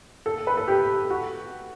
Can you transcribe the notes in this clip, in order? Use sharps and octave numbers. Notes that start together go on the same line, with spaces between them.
A4
B4
A4
G4
F#4